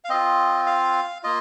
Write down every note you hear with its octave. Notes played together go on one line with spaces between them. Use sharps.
F5
C4 F4 D#5
F5
A#3 F4 D#5